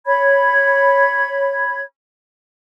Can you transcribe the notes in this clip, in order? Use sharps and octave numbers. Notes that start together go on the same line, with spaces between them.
C#5 B5 G#6